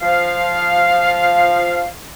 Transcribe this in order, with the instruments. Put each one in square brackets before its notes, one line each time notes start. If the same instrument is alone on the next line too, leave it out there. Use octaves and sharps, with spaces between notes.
[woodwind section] F3 F5